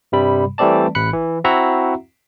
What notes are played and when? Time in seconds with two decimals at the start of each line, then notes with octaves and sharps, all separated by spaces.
0.12 G2 C3 G3 B5
0.58 E3 G3 A3 C4 D5 A5
0.95 A1 B5 F#6 C#7
1.13 E3
1.44 C4 E4 F#4 E5 F#5 A#5